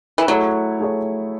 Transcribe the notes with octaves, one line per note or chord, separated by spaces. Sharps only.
E3
F#3 A3 E4 G#4 C#5
A3 E4 G#4 C#5